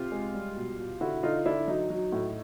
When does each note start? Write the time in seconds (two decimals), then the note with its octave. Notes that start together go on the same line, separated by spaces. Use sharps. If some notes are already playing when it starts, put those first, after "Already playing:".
Already playing: C3 F4 G4
0.12 G#3
0.34 G3
0.56 B2
0.79 B2
1.01 D3 E4 F#4
1.23 D3 D#4 F4
1.45 D3 D4 E4
1.67 F#3 D#4
1.90 F#3
2.12 A2